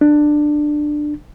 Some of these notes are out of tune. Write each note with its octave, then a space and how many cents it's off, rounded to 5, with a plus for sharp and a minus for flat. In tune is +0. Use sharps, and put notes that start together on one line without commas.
D4 +15